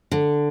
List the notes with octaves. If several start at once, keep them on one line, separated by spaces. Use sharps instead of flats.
D3